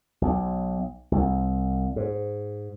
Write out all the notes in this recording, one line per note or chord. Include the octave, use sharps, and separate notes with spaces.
B1
C2
G#2